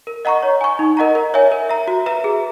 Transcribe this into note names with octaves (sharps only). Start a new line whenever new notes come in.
A#4
D#5 F#5 A#5 C#6
C#5
G#5 C#6
D#4
A#4 D#5 F#5 A#5
A#4
C#5 E5 G#5
A#4
E5 A#5
F#4
B4 E5 A#5
G#4